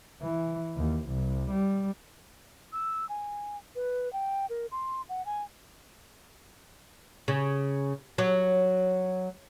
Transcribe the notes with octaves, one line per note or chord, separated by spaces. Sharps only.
E3
D#2
C2
G3
E6
G#5
B4
G5
A#4
C6
F#5
G#5
C#3
F#3